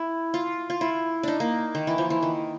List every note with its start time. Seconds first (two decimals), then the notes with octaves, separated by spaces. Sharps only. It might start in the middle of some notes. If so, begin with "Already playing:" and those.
Already playing: E4
0.34 F4
0.70 F4
0.81 E4
1.23 D4 D#4
1.40 A#3
1.75 D#3
1.87 E3
1.98 F3
2.10 E3
2.23 D#3